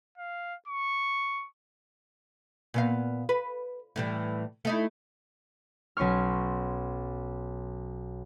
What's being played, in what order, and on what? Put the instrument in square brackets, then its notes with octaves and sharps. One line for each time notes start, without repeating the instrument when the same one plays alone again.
[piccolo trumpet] F5
C#6
[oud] A#2 B3 F5
B4
A2 E3 G3
A3 D#4 E4
[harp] B1 C#4 C6 C#6 F6